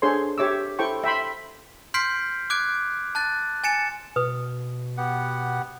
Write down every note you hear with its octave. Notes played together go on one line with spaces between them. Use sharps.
D4 G#4 A4 C5 C#5 C6
G4 C#5 E5 D6 E6
E4 A4 C5 G5 C#6
E5 G5 B5 C6
C6 F6 G6 B6 C7 D7
D6 F#6 G#6 D7
A5 F#6 A6
G#5 A6 C#7 E7
B2 B4 D#6
B3 G4 F#5